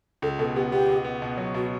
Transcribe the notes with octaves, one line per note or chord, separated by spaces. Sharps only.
C#2 A4
B2 A4
B3 G4
B3 G4
C#2
B3
B2
F#3
B2 F#4